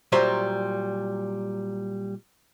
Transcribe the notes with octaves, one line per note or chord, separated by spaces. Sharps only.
A#2 F#3 G3 C5 E5